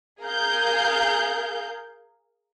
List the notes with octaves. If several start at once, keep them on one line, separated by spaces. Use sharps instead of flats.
G#4 A#4 F5 G6